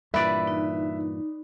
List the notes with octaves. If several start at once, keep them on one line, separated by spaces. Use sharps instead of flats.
G2 A#2 E3 B4 D5 E5
D#4